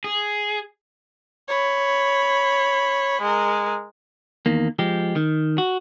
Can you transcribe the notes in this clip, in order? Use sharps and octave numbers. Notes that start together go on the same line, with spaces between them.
G#4
C#5 B5
G#3 A#4
E2 D#3 A#3
F3 G#3 G4
D#3
F#4